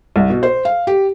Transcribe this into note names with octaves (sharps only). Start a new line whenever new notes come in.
C2
B2
C5
F5
G4